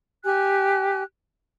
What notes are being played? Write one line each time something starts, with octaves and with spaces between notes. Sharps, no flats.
G4 G#5 F#6